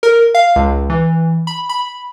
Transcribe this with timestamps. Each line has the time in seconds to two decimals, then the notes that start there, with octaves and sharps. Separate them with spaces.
0.03 A#4
0.35 F5
0.56 C#2
0.90 E3
1.47 B5
1.69 B5